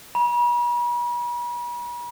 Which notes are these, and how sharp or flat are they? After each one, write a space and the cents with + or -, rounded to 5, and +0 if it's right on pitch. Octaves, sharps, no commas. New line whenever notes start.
B5 -45